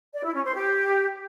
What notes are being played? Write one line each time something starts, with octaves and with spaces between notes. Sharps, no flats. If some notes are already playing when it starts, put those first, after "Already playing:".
D5
E4
C#4
C5
G4